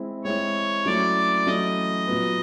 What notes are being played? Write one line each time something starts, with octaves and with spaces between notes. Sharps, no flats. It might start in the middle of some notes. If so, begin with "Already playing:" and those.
Already playing: G#3 C4 E4
G#3 C4 E4 C#5
F#3 A3 C#4 E4 D5
F#3 A3 C#4 E4 D#5
A#2 F#3 B3